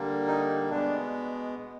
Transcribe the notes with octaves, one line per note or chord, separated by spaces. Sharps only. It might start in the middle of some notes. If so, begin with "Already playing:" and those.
Already playing: D3 G3 A#3
D#4
B2 G#3 B3 D4